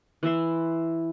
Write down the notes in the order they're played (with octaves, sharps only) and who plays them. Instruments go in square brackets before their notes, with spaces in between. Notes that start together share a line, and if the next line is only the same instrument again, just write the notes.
[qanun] E3 E4 E5 C6